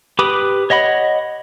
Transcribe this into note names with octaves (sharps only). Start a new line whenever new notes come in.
G4 B4 B5 D6 D#6
C#5 D#5 F#5 B5